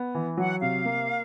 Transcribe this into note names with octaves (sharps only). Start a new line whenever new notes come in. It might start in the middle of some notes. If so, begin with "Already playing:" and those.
Already playing: B3
E3
F#3 F#5
C3 F5
A#3